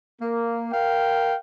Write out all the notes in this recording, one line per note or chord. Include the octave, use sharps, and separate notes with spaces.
A#3
A#4 F5 G5